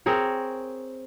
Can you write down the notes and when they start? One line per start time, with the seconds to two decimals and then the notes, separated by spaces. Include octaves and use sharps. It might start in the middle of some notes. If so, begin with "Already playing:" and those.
0.06 C4 G#4 A#4 C#5